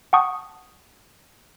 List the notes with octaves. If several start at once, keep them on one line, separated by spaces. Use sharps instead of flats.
F#5 G5 A5 C#6 D#6